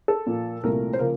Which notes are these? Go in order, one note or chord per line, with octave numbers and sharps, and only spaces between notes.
A4
A#2 F3 A#3
C2 A#2 F3 A3 A#4
C5
C#3 F3 A#3 A#4